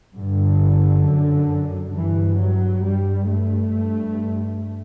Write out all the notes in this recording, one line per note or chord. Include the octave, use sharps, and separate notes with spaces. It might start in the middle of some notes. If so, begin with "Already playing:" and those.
G2 D3
F#2
G2 E3
F#3
G2 G3
A3
G2